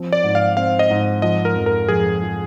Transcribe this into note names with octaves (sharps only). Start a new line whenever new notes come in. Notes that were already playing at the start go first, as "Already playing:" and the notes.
Already playing: F3 C4
D5
G#2
F5
C4 F5
D#5
G#2
F3 D#5
A#4
F2
A#4
F2 G#4
F3